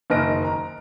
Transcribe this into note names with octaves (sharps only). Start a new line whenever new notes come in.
F#1 D#3 D#5 F6 A#6 D7
A#5